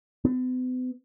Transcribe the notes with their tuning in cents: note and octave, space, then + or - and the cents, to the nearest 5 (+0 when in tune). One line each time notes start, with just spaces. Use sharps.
B3 +45